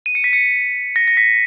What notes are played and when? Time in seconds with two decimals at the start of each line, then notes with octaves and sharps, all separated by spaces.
0.06 D#7
0.15 C#7
0.24 B6
0.33 C#7
0.96 A#6
1.08 A#6
1.17 B6